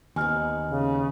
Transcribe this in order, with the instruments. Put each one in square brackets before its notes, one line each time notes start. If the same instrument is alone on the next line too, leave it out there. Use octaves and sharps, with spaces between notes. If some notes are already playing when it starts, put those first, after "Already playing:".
[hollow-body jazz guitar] D#2 [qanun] B3 C4 D#4 [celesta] G#5 F6
[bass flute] C#3